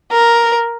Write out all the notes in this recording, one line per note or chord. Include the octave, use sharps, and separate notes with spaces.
A#4